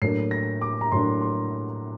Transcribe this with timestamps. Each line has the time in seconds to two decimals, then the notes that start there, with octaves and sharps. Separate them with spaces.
0.02 A2 F#3 A#3 D4 C7
0.31 A#6
0.61 D6
0.81 A#5
0.92 A2 F#3 A#3 D4 C6
1.21 C6